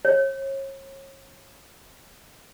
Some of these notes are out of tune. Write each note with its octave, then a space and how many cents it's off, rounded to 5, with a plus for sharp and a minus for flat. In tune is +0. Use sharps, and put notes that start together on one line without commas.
C#5 -35